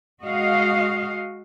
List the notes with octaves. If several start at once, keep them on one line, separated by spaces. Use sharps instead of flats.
G#3 F#4 D#5 F5